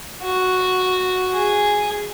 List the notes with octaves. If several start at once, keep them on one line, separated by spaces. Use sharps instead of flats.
F#4
G#4